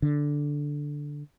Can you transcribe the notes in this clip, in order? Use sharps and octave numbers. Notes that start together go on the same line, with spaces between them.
D3